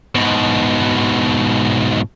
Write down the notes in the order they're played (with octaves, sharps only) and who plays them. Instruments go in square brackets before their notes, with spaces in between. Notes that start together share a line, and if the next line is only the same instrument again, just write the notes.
[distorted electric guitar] G#2 B2